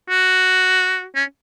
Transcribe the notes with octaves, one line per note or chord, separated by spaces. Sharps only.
F#4
C#4